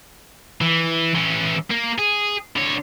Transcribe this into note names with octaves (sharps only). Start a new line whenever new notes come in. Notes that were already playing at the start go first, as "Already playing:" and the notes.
E3
E3 C#4
A#3
G#4
D3 C#5